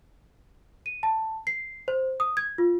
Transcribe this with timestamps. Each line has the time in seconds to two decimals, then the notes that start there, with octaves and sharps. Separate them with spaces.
0.86 D#7
1.03 A5
1.47 C7
1.88 C5
2.20 D#6
2.37 G#6
2.58 F4